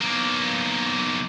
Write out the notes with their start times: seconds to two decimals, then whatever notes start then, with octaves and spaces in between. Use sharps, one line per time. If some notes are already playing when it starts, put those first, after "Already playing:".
0.01 B1 A#3